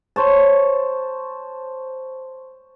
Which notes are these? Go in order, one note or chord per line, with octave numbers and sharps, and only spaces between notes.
C5 C#5 A5